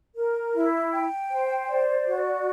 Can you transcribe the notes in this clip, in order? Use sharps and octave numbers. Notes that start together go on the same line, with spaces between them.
A#4
E4
G5
C5
D5
F#4